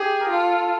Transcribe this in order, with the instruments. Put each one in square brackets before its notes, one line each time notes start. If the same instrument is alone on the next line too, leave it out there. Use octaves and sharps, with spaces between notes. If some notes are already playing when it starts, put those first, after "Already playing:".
Already playing: [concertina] G4 [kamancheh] G#4
[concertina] A#4
[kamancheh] F4 [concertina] A4